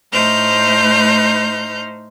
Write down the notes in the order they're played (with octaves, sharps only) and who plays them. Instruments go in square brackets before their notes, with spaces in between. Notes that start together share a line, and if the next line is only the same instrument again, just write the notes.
[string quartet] A2 A3 D#4 C5 F6 G6